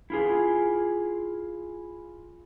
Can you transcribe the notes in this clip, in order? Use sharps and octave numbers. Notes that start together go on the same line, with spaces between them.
E4 F4 G#4